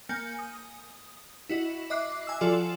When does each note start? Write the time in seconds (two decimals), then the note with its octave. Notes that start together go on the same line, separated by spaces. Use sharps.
0.09 A#3 G#5 G6 C#7
0.39 D#6
1.49 E4 F#4 D#5
1.90 D#5 E5 D6 F#6 C7
2.27 G#5 E6
2.41 F3 F4 F#4 A4 D5 E7